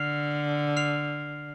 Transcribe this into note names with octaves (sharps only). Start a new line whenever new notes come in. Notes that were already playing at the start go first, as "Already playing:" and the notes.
Already playing: D3 F6 C7 F7
F6 C7 F7